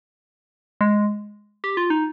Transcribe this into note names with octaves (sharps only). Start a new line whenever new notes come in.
G#3
G4
F4
D#4